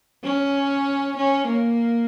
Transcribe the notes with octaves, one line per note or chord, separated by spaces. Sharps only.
C#4
C#4
A#3